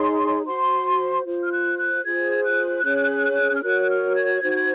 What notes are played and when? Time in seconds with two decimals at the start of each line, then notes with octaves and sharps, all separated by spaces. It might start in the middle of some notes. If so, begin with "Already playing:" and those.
Already playing: D#4 G#4 C#5 C6
0.45 F#4 C5 C6
1.25 F4 C5
1.43 F6
1.52 F#6
1.78 F#6
2.04 F4 G#4 C5 G#6
2.44 F#6
2.84 C#4 G#4 C#5
3.56 F6
3.63 F#4 A#4 C#5 F#6
3.89 F6
4.16 G#6
4.42 D#4 F#4 C5